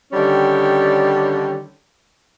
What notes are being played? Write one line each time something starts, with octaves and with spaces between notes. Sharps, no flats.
D3 D#3 G3 C#4